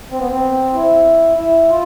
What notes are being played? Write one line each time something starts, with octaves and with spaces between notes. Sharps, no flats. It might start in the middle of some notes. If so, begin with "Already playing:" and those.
C4
B3
C4
E4
E4
F4